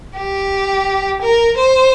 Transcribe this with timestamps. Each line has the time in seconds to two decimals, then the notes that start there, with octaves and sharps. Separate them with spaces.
0.16 G4
1.22 A#4
1.57 C5